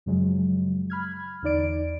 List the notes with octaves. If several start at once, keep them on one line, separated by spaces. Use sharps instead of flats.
F#2 C#3 F3 F#3 G#3
B5 F6 G#6
E2 D3 D#4 D5 D7